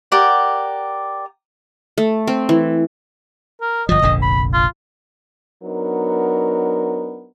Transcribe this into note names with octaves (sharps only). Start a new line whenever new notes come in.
G4 A#4 D5 F#5
A3
C4
E3
A#4
G1 F3 D#5
F1 A#1 D3
B5
F4
F#3 B3 D4 D#4 A#4